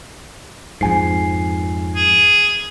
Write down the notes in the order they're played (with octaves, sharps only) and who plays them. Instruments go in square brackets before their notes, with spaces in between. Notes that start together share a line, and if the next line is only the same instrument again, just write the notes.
[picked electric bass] F2 G#2 [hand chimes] G#5 C7
[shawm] G#4